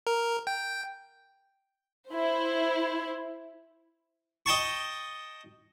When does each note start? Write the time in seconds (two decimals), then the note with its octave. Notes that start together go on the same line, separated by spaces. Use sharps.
0.07 A#4
0.47 G5
2.11 E4 C5
4.46 D#5 G5 A5 C#6